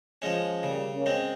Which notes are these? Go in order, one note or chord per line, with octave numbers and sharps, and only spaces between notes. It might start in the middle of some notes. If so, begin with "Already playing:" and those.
F3 G#3 C#4
C#3 G3 A#3
A#3 C#4
G#3 C4